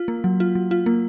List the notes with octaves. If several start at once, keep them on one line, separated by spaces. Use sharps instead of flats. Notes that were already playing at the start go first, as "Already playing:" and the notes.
Already playing: F4
A#3
F#3
F4
F#3
F4
A#3